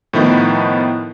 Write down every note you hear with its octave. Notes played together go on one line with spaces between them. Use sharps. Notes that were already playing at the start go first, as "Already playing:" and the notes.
A2 D#3 F3 B3 D#4 E4